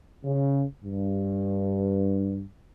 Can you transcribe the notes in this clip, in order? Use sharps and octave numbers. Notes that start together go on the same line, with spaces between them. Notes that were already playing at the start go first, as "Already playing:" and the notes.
C#3
G2